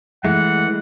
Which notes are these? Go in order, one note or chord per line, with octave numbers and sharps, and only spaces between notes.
E3 G#3 A3 F#5